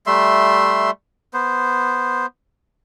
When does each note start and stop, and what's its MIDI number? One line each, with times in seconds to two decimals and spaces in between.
0.07 0.90 55
0.07 0.90 57
0.07 0.90 76
0.07 0.90 84
1.34 2.26 59
1.34 2.26 72